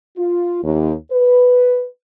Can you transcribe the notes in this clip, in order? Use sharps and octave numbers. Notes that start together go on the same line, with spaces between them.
F4
D#2
B4